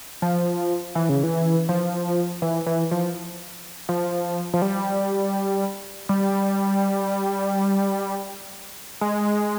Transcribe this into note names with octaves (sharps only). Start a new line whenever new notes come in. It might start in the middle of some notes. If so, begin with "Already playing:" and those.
F3
E3
C#3
E3
F3
E3
E3
F3
F3
F3
G3
G3
G#3